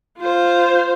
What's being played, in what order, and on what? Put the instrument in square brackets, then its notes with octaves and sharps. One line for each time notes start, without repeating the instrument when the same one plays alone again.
[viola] F4 C5